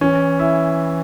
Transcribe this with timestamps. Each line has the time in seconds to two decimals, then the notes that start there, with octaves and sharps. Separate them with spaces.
0.01 E3 C#4
0.39 E4